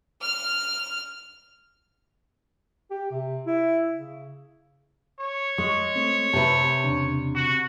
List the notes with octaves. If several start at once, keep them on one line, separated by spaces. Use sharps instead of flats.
F6
G4
C3
E4
C#3
C#5
G#3 C#6
A3 C4
C3 B4 E5 A5
E2 C#3 D4
F#4